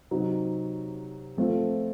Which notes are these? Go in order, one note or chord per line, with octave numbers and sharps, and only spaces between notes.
C3 F#3 C4 D#4
F3 A3 C4 F4